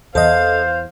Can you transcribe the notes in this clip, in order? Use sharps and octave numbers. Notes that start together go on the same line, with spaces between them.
E2 E3 A4 C5 D#5 F5